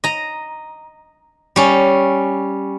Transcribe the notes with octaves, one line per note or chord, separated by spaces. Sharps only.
D#5 A#5
G3 C#4